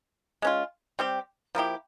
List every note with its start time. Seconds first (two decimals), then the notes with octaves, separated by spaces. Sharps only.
0.42 G#3 C#4 F4
0.99 G3 C4 G4
1.55 F3 A#3 E4 G4